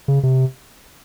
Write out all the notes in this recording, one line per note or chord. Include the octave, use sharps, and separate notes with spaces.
C#3
C3